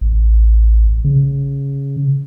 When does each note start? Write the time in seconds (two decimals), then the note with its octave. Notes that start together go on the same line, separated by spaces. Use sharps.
0.01 A1
1.05 C#3